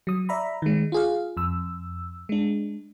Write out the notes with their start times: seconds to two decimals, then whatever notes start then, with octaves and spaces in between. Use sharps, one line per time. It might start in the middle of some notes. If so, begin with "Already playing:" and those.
0.07 F#3 D#6
0.29 D5 E5 A#5 B5
0.62 D#3 G#3
0.92 F4 G#4 F5
1.37 F2 E6
2.29 G#3 D4